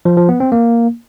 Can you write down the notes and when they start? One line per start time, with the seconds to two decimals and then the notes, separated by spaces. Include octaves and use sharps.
0.05 F3
0.17 F3
0.29 B3
0.40 C4
0.52 A#3